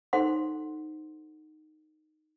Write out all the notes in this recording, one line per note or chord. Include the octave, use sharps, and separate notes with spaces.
D#4 A4 C5 F#5 C6